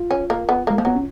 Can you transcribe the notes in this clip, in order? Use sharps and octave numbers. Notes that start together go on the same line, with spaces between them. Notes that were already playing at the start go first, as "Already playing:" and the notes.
Already playing: F4
C#4
A#3
B3
G#3 A#3
F3 A#3
F#3 B3
C#4